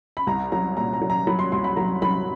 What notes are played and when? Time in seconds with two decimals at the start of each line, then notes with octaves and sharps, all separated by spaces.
0.17 B5
0.27 C2 A#5
0.52 F#3 A#5
0.77 A#2 A#5
0.93 A#5
1.02 F#3
1.10 A#5
1.27 F#3 B5
1.39 C6
1.52 C2 C6
1.64 B5
1.76 F#3 A#5
2.02 F#3 B5